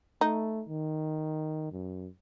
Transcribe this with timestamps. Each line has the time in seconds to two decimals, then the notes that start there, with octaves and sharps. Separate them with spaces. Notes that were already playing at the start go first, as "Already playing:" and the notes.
0.21 A3 D#4
0.68 D#3
1.72 F#2